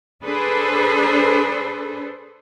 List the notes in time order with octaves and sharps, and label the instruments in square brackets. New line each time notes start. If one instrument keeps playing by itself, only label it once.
[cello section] D4 G#4 A4 B4 C5